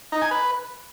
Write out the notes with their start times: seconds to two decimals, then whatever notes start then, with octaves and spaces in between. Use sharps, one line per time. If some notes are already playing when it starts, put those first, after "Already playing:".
0.12 D#4
0.22 G#5
0.31 B4